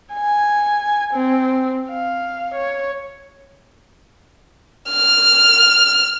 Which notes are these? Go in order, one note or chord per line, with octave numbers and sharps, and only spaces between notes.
G#5
C4
F5
C#5
F6